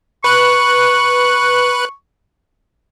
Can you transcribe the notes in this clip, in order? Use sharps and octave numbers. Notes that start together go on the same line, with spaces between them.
B4 C#6 F#6